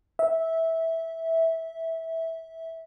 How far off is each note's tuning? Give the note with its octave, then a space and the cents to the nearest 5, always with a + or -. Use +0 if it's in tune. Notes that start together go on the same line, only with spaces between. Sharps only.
E5 -15